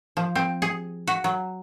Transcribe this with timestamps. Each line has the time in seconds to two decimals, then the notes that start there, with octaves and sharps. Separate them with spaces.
0.17 F3
0.35 C4
0.62 G#4
1.07 F#4
1.24 F#3